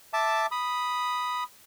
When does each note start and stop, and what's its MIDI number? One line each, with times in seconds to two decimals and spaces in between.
0.13 0.46 76
0.13 0.46 81
0.13 0.46 86
0.51 1.44 83
0.51 1.44 87